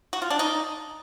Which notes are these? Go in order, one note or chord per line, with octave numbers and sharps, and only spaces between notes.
F#4
F4
D4
D#4